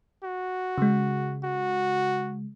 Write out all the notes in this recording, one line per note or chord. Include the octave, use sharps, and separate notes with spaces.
F#4
C#3 G#3
F#4